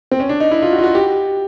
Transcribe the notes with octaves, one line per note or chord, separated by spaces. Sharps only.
C4
C#4
D4
D#4
E4
F4
F#4
F4
F#4
G4